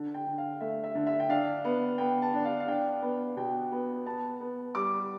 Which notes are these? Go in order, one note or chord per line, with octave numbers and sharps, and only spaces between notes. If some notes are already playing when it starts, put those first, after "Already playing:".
Already playing: D3
G5
D3
F5
A3 E5
E5
D3
E5
G5
D4 F5
B3
B3 G5
A5
D4
F5
F5
D4 G5
B3
B2 G5
B3
B3 A5
B3
G3 D6